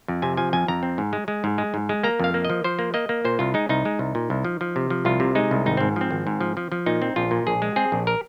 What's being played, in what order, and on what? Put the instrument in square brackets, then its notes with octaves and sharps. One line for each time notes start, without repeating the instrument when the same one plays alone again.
[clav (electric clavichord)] F2
C3 G#5
F3 G#5
F2 G#5
F2 A#5
C4
G#2
G#3
G#3
G#2
G#3
G#2
G#3
A#3 A#5
F2 F5
A#3
D#5
F3
F3 C5
A#3
A#3 D#5
A#3
A#2 C5
C2 F4
G#3 D#4
C2 D#4
G#3
C2
A#2
C2
F3
F3
C3
F3
C2 F4
C3
G#3 D#4
C2
G#1 D#4
G#2 C4
F3 C4
G#1
G#2
F3
F3
F3
A#2 D#4
C4
A#1 F4
A#2
A#1 G#4
G#3
C4 G#4
A#1
A#4